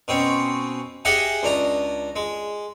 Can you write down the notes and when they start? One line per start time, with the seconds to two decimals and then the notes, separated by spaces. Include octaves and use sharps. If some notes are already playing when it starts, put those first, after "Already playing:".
0.08 B2 C4 C#4
1.05 G4 G#4 D#5 E5 F#5 G#5
1.43 C#2 D4 A#5
2.16 G#3